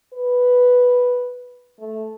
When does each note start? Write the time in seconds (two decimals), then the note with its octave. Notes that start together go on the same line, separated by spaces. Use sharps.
0.14 B4
1.80 A3